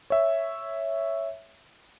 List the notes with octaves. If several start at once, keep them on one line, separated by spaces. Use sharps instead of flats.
C#5 E5